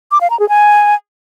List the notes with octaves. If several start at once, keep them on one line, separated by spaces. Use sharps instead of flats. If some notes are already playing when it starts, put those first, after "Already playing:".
D6
F5
A#5
G#4
G#5